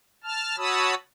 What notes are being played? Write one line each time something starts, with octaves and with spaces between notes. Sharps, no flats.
A5 F6
F#4 C#5 A5 B5 D#6 E6